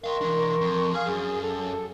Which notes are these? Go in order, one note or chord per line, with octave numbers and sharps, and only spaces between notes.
A#4 D#5 F5 C6 C#6
E3 D4
F2
G#4 F5 G#5 F6
F#2 G#4
A4